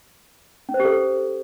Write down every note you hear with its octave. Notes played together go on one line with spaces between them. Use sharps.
C#4
C5
G4
A4